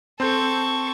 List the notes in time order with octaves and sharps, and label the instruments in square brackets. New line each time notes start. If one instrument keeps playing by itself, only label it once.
[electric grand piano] C4 C6 G6 [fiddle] A4 C#6